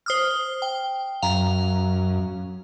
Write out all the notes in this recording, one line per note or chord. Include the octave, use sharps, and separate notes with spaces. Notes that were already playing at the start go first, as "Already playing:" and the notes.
C5 D#6 F6
G5
F#2 F5 A#5